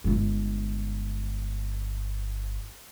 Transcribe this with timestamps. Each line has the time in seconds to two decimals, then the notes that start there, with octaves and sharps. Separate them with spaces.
0.04 G1 G#3